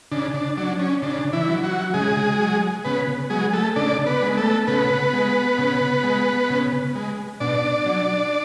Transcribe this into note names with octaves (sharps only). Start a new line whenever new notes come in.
C#3 D4
D4
F#3 D4
C#4
C#3 D4
E3 E4
F#3
F#3 F#4
C#3 G#3 G#4
F#3
C#3 B3 B4
F#3 G#3 G#4
A3 A4
C#3 D4 D5
B3 B4
G#3
A3 A4
C#3 B3 B4
G#3
C#3
G#3
C#3
G#3
B2 D4 D5
F#3